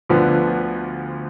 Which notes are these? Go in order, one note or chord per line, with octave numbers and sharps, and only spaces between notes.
D2 D3 F3 B3